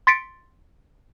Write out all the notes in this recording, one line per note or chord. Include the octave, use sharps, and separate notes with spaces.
C6 A6 B6 C#7 D7